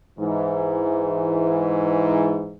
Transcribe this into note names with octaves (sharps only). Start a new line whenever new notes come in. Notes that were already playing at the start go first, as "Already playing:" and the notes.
G#2 E3